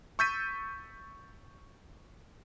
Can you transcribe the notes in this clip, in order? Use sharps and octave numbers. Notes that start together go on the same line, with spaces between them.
C#6 E6 G6 A6 B6 D#7